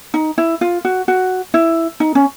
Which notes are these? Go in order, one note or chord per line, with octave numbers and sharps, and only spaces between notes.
D#4
E4
F4
F#4
F#4
E4
D#4
C#4